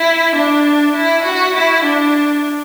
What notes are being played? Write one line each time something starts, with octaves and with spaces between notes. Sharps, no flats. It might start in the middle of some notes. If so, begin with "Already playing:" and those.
Already playing: E4
D4
E4
F#4
E4
D4